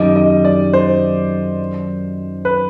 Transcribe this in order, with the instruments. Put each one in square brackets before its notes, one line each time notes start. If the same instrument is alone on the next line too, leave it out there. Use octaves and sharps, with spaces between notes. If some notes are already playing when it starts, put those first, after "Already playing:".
Already playing: [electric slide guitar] F#2 D#3 G3 [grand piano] D#5
[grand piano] D#5
D5
C5
B4